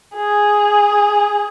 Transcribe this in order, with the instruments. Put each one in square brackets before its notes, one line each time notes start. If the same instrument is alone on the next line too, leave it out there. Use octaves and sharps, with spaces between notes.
[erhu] G#4